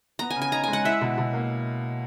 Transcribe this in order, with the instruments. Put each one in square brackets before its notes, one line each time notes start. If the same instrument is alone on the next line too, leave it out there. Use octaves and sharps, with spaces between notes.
[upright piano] B3 [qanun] A#5
[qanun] G#5
[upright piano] C#3
[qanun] G#5
[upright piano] D#4 [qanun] A#5
[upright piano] G#3 [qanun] G#5
[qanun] F#5
[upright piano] E4 [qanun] E5
[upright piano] B2
B2
A#3